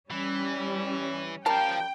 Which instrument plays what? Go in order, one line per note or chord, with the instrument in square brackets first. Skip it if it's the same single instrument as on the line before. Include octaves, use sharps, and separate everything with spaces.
[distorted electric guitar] E3 [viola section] G3 [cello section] C#4
[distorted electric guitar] F3 F5 [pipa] G3 A#4 A5 [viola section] G5